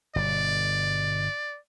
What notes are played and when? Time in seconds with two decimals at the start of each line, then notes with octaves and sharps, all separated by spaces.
0.16 G1 B2 D5